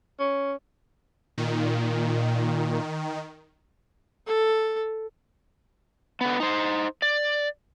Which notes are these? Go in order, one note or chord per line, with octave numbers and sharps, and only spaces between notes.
C#4
A#2 D#3
A4
D3 B3
D#4 C5
D5